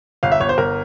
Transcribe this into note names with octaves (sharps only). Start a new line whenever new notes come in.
G1 F5
E5
G1 C#5
C5
G1 A#4